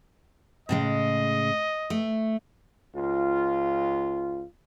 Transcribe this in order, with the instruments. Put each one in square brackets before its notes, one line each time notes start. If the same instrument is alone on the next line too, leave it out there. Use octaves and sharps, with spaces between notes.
[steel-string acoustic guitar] A2 C#3 G#3 [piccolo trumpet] D#5
[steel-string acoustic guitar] A3
[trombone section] C#2 F4